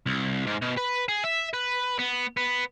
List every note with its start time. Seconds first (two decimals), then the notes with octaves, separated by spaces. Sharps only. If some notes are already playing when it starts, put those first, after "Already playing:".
0.06 C2
0.47 G#2
0.62 B2
0.77 B4
1.09 G#4
1.24 E5
1.53 B4
1.99 B3
2.37 B3